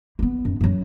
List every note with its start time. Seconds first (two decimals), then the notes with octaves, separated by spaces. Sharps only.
0.19 A#3 B3
0.45 F#2
0.61 F#2 F#3